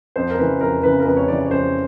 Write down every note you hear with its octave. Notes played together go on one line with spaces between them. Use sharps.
F2 C5
A#4
C#3 E3 B4
F2 A#4
C#3 E3 B4
A#4
F2 B4
C#5
C#3 E3 D5
D5
C#5
F2 C5